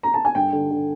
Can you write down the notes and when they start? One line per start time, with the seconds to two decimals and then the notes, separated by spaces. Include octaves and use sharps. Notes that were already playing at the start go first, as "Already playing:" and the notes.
0.03 A#5
0.14 A5
0.25 G#5
0.35 G2 G5
0.53 D3
0.71 D3